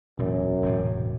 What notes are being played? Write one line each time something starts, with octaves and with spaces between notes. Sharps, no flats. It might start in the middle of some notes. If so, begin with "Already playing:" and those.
E1 F#2 A#2
E1 A2 C3